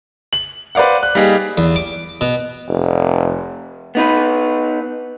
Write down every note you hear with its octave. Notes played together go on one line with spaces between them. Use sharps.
F#7
B4 C5 D5 F5 F#5
F#6
G3 A#3 D#4 G4 G#4
E2
D6
B2
F1
B3 D#4 B4